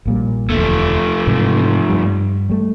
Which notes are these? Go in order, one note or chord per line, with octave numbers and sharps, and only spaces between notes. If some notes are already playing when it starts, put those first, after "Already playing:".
A#1 A#2 G3
E1 D2 F3 A3
G#2 C3 E3
G2 G3
G3 A3